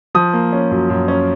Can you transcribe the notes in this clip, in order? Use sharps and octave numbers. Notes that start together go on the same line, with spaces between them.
F3 D#6
A#3
C#4
F#2
F#2
C#4